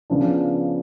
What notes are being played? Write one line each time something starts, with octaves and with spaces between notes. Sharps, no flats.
C#3 F3 B3 D4